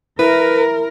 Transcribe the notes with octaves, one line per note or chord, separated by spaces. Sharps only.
E4 A#4 B4